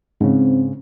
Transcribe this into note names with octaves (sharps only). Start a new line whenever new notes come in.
G#2 C#3 C4